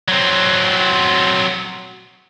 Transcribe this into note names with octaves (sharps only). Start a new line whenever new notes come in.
F#3 C4